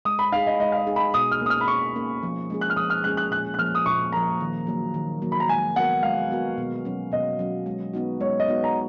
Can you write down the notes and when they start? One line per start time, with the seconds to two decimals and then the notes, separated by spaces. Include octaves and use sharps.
0.05 G#3 D#6
0.19 B5
0.32 D#4 G#4 F5
0.47 D#5
0.60 G#3 D#5
0.72 F5
0.78 D#5
0.87 D#4 G#4
0.96 B5
1.14 B2 D#6
1.32 F6
1.41 A#3 C#4 D#6
1.50 F6
1.61 B5
1.68 B2 C#6
1.95 A#3 C#4
2.23 F3
2.50 G#3 C#4 G#4
2.61 F#6
2.70 F6
2.77 F3 D#6
2.90 F6
3.04 G#3 C#4 G#4 F#6
3.17 F#6
3.31 A#2 F#6
3.54 F#6
3.59 F3 A#3 F6
3.75 D#6
3.86 A#2 C#6
4.12 F3 A#3 A#5
4.40 D#3
4.67 F#3 A#3
4.94 D#3
5.22 F#3 A#3
5.32 B5
5.40 A#5
5.49 G#3 G#5
5.76 B3 F#4 A#4 F#5
6.03 G#3 F5
6.30 B3 F#4 A#4
6.58 B2
6.85 F#3 C#4
7.12 B2 D#5
7.39 F#3 C#4
7.66 G#3
7.94 B3 D#4 F#4
8.21 G#3 C#5
8.40 D#5
8.48 B3 D#4 F#4
8.64 A#5